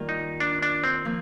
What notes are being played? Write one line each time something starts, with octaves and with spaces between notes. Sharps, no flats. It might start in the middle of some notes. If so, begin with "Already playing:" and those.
Already playing: D#3 G3 A#3 F4 A#4
D#4
D4
D4
C4
F3 A#3